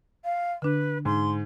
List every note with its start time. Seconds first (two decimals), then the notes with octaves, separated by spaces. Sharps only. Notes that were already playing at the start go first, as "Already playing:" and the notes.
0.24 F5
0.62 D3 D4 B4
1.05 G#2 C6